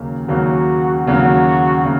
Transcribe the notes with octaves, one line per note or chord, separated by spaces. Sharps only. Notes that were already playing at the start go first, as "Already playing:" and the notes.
Already playing: D#2 C#3 F#3 A#3 C#4
D#2 C#3 F#3 A#3 C#4 F#4
D#2 C#3 F#3 A#3 C#4 F#4
C#3 A#3